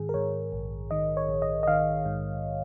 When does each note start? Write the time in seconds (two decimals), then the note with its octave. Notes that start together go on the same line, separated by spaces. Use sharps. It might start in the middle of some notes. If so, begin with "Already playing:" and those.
Already playing: G#2 D#3 G#4
0.09 A#4
0.14 G#2 C#5
0.52 A#1
0.91 D#3 D#5
1.17 C#5
1.29 A#1
1.42 D#5
1.63 D#5
1.67 D#3 F5
2.06 G#2